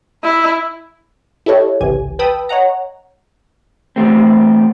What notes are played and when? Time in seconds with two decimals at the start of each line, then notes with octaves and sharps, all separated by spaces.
0.24 E4
1.46 E4 G4 A4 C#5 D#5
1.80 G#1 C#2 C3 E3 G4 G#5
2.19 B4 G5 A5 B5 D#6 E6
2.49 C#5 D#5 F#5 A#5
3.96 E2 A3 C4